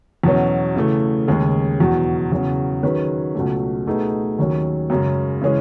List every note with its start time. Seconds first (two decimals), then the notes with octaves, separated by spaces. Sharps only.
0.24 E2 B2 F#3 C#4
0.76 C#3 E3 A3
1.28 D#2 C#3 G#3
1.79 E2 B2 F#3
2.32 E2 C#3 F#3 C#4
2.83 D#3 F#3 C#4 G#4 B4
3.35 C#2 B2 F#3 A3
3.86 B2 A3 D#4 G#4 B4
4.39 D#2 D#3 F#3 C#4
4.90 F#2 C#3 G#3
5.42 C#3 E3 G#3 C#4 G#4